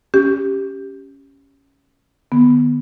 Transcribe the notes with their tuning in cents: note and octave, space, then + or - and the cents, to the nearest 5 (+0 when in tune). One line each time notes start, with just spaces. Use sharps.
C#4 +0 G4 +0
D#3 -45 B3 -5